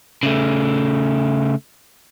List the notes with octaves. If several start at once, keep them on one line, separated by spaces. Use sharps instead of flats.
C#3 A3